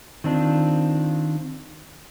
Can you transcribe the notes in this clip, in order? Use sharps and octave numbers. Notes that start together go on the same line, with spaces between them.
D#3 C4 D4 F4